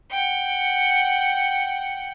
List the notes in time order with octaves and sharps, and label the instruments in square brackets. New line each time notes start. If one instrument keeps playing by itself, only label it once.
[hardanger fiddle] F#5 G5